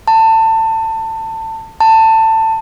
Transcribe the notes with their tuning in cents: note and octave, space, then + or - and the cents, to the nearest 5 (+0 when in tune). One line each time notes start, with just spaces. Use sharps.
A5 +25
A5 +20